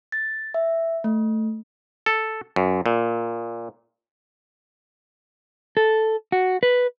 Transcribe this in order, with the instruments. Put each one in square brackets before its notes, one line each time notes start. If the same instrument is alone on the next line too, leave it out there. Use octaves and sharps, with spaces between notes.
[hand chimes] A6
E5
A3
[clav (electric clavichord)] A4
F#2
A#2
[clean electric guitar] A4
F#4
B4